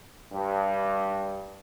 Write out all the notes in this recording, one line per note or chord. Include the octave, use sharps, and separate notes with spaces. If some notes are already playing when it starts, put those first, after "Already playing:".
G2